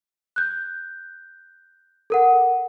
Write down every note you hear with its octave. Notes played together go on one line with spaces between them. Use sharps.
F#6 G6
A4 A#4 F#5